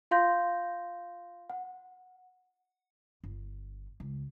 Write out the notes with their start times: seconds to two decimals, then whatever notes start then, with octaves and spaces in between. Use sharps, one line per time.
0.11 F4 F5 C6 G6 A#6
1.50 F#5
3.23 G1
4.00 C#2